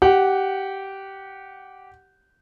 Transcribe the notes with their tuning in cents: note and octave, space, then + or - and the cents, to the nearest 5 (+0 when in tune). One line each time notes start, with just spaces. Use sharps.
G4 -15 F#5 +0